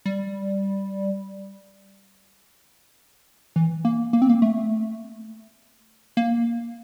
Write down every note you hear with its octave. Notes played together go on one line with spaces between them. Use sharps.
G3
E3
A#3
A#3
C4
A#3
A3
A#3